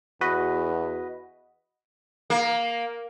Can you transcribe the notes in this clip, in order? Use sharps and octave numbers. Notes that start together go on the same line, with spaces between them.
E2 F#4 B4 D#5
A#3